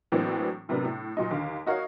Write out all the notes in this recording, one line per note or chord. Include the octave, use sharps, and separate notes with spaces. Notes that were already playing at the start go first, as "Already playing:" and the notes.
A2 E3 F#3 A#3 C4 D4
A2 C3 F#3 B3 D4 A#4
A2
A#2 F#3 D#4
D#2 D3 F5
D#4 F#4 A#4 C#5 F5